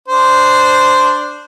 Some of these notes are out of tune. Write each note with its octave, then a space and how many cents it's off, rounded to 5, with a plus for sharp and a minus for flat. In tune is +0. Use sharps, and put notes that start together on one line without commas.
D4 +0 C5 -10